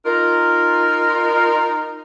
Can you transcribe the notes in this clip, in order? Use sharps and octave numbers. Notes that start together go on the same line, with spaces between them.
D#4 F4 A#4